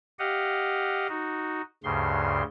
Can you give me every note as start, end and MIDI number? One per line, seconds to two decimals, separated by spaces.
0.19 1.08 67
0.19 1.08 75
0.19 1.08 77
0.19 1.08 78
1.09 1.61 63
1.09 1.61 66
1.84 2.42 38
1.84 2.42 43
1.84 2.42 49
1.84 2.42 84